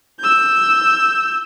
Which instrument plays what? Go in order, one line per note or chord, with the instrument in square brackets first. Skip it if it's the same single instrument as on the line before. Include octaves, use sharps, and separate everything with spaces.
[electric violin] E6 G6